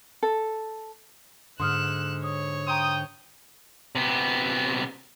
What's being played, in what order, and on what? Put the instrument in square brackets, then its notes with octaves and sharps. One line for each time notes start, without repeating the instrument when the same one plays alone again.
[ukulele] A4
[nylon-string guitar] G#2 D3 [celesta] C6 D#6 F6 [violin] F#6 E7
[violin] C#5 [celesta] D#6
[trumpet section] G5 D#6 [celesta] A#5 C6
[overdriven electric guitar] C3 B3